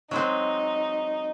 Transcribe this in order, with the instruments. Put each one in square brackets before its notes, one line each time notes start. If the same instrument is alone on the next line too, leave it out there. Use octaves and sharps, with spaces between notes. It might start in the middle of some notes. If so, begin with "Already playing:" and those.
[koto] F#3 G#3 C4 [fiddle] D#4